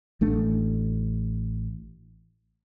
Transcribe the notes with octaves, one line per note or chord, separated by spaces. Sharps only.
A1 A3 D4